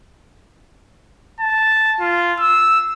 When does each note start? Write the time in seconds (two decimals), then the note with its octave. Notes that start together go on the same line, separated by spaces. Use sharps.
1.41 A5
2.01 F4
2.40 E6